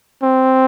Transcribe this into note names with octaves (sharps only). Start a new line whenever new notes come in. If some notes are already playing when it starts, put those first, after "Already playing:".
C4